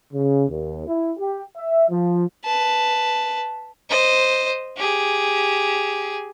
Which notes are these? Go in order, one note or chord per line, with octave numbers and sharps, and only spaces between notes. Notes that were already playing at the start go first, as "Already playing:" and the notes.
C#3
D#2
E4
G4
E5
F3
B4 A5
C5 D#5
G4 G#4